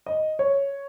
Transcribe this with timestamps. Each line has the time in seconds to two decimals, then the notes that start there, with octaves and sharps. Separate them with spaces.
0.06 D#5
0.39 C#5